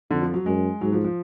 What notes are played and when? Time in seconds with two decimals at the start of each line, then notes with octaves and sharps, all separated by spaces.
0.10 F2 D3
0.22 F3
0.34 F#3
0.45 F#2 G#3
0.81 G#2 F#3
0.92 F3
1.04 F3